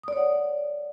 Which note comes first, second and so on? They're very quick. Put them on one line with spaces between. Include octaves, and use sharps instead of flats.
D#6 D5 C#5 F#5